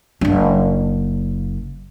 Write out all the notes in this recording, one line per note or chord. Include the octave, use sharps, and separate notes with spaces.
F#1 D4